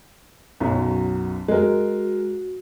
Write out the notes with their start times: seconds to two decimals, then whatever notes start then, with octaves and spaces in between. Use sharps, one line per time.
0.60 B1 F#2 F#3 C#4
1.48 G#3 F#4 A#4